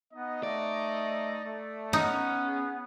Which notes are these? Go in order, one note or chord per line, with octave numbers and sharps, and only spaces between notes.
B3 D#4 D#5
A3 D5
A3
B3 C#4 D#4
G#4